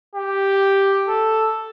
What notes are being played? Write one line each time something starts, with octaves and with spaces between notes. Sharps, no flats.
G4
A4